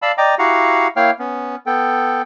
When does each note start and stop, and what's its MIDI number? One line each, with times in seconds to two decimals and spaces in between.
0.02 0.12 74
0.02 0.12 77
0.02 0.12 81
0.02 0.12 83
0.02 0.12 88
0.18 0.35 74
0.18 0.35 75
0.18 0.35 79
0.18 0.35 82
0.18 0.35 86
0.39 0.87 64
0.39 0.87 66
0.39 0.87 67
0.39 0.87 77
0.39 0.87 78
0.39 0.87 82
0.96 1.11 58
0.96 1.11 64
0.96 1.11 73
0.96 1.11 77
0.96 1.11 79
0.96 1.11 89
1.19 1.56 59
1.19 1.56 61
1.66 2.22 59
1.66 2.22 69
1.66 2.22 79